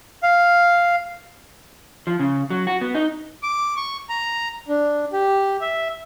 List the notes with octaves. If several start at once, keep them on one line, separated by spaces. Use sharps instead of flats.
F5
F3
C#3
F#3
F#4
B3
D#4
D6
C#6
A#5
D4
G4
E5